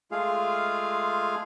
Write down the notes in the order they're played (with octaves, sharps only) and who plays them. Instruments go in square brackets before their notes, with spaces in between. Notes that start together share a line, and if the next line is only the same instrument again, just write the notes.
[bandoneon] G#3 A3 F4 G#4 F5